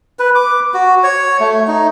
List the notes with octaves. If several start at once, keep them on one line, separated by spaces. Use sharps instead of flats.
B4
D6
F#4
C#5
A3
D#4